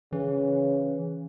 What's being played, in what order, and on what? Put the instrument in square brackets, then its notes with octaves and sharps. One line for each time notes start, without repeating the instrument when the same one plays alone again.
[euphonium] C#3 [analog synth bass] E3